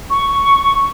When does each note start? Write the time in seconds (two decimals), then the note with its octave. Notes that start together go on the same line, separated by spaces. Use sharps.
0.10 C#6